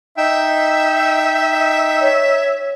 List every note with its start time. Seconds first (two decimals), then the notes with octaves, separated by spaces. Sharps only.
0.17 D#4 E5 G5 E6
2.02 C#5